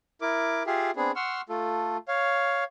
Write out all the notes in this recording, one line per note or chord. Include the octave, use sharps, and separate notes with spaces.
E4 A#4 D6
F4 G4 G#4 E5 F5
B3 C4 D4 G#4
F#5 C6 C#6 E6 F6
A3 F4 A4
C#5 F5